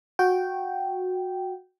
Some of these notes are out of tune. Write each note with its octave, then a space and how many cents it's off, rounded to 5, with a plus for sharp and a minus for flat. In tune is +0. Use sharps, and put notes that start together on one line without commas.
F#4 -15 G5 -10